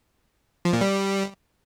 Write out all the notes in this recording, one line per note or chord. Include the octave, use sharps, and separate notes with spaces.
F3
A#2
G3